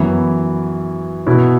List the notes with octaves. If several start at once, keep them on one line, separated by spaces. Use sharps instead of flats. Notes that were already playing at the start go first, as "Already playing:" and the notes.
Already playing: F#2 E3 B3 E4
B2 B3 E4